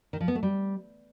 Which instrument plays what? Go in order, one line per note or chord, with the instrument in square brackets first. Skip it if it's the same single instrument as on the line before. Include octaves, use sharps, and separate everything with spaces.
[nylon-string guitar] D#3
F3
B3
A3
G3